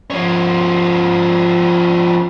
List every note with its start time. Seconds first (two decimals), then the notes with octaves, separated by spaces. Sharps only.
0.10 F3 C#4